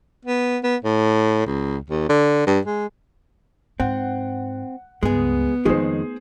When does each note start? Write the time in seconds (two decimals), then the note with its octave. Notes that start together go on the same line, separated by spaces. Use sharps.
0.25 B3
0.63 B3
0.84 A2
1.46 C#2
1.90 D#2
2.09 D3
2.47 G2
2.65 G#3
3.80 G#2 C4 F#5
5.03 C#2 G2 G#3 B3 G#4
5.65 F2 D#3 G#3 A3 D#4 G#4 C5